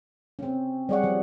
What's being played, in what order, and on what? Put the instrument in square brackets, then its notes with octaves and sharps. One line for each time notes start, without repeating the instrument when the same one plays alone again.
[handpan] C4 C#4
[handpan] G3 G#4 F#5 [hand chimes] C#5 D5 C#6
[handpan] F3